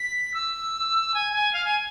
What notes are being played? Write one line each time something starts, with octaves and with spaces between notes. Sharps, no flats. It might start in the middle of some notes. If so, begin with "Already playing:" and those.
Already playing: B6
E6
G#5
G#5
F5
G#5